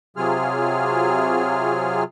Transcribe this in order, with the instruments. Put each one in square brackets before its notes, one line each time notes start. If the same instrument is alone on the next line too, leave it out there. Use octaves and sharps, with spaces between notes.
[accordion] C3 F#3 F4 G#4 F6